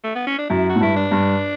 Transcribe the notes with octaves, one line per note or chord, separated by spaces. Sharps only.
A3
B3
C#4
D4
F#2 E4
F#4
A2
G2 E4
D4
G2